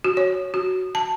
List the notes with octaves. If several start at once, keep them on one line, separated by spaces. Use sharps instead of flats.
F#4
C#5
F#4
A5